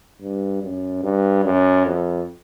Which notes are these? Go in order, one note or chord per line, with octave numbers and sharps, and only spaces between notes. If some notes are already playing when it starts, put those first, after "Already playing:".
G2
F#2
G2
F#2
F2